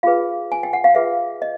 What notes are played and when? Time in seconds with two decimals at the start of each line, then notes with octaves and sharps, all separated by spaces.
0.03 F4 G#4 B4 F5
0.52 G#5
0.63 G5
0.73 F#5
0.84 F5
0.95 F4 G#4 B4 E5
1.42 D#5